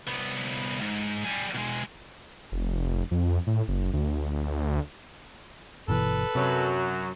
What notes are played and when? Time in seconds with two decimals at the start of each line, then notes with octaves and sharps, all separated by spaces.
0.07 C2 B3
0.81 G#2
1.25 G3 G#4
1.55 B2 G#3
2.52 F1
3.11 F2
3.47 A2
3.68 F#1
3.93 D2
5.88 G1 B2 E3 A4 B4
6.35 F#2 C3 F#3 F#4